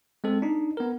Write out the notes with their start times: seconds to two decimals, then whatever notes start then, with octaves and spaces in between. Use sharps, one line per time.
0.24 G#3 C4 A4
0.42 D4 D#4
0.77 B3 A#4